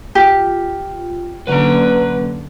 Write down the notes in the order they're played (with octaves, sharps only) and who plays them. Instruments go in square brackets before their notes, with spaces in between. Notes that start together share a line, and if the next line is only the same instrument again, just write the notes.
[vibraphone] F4 [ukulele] G4
[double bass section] D3 [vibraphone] F#3 A#3 C#4 [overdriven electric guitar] B4 A#5